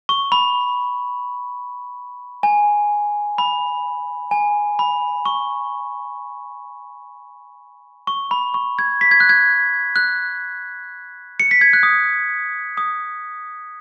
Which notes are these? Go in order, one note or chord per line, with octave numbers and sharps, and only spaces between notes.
C#6
B5
G#5
B5
G#5
B5
C#6
C#6
B5
C#6
G#6
B6
G#6
F#6
G#6
F#6
C#7
B6
G#6
F#6
D#6
D#6